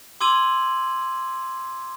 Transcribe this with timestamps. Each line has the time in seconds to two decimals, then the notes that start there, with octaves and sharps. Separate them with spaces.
0.21 C6 D6 E6 G#6 D#7 F#7